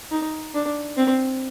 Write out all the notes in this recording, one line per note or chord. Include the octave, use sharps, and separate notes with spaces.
D#4
D4
C4